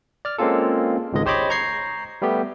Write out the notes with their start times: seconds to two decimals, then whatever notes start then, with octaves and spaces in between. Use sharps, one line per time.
0.25 D5 F6
0.38 G#3 A#3 C4 C#4 F4 A4
1.13 G#1 C#2 G#2 G#3 D#5
1.26 G4 C5 C#5 D#5 B5 D6
1.50 A#5 C#6 G6 G#6 A#6 C7
2.22 G3 A3 B3 G4